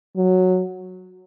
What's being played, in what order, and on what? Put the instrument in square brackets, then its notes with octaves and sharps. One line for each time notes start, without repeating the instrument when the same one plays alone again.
[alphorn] F#3